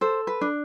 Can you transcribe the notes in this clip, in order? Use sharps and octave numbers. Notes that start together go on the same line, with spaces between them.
A4 C5
B4
D4